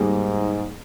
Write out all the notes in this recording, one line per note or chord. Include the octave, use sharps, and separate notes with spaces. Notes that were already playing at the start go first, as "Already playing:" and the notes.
Already playing: G#2 D#3 G3 A#3 D#4 G#4